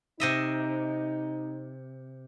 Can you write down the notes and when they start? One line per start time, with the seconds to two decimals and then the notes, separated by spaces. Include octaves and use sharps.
0.20 C3 D#4 D#5 E5